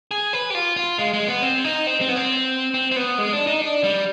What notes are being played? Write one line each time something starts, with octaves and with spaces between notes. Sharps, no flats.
G#4
B4
G4
F4
F4
G#3
G#3
B3
C4
D#4
C4
C4
B3
C4
C4
C4
B3
G#3
D4
D#4
D4
G3